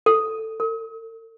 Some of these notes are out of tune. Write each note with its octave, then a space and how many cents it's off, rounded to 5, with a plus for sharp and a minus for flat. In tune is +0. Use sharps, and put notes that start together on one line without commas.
A4 +10
A4 +45